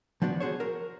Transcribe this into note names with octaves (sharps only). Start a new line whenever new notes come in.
F3 B3 D4 F#4
F#4 G#4 C5 C#5
A#4